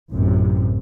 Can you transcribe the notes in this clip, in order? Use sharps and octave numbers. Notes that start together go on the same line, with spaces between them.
A1 F#2 C3